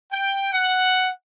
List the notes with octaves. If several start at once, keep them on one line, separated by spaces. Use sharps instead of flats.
G5
F#5